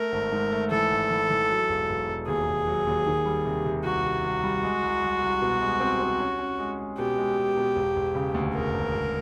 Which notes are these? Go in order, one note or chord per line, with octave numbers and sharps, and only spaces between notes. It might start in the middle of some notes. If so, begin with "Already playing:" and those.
Already playing: A3 A#4
G#1
G#2
A3
E3 A4
G#1
E3
E3
F#3
E1
E1
E1
D#2 G#4
E1
F#3
D#2
D#3
G3
C3
C3
C2 F#4
C3
C2
G3
G#3
C2
C2
C2
B2
G#3
C4
C4
C#4
C#4
G#3
G#3
B2 G4
G#3
G#3
B2
E1
E1
C#3
D2
E1 A#4
E1
E1